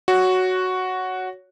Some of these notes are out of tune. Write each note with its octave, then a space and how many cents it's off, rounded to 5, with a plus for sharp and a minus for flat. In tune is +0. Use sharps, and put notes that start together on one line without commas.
F#4 +0 C#5 +10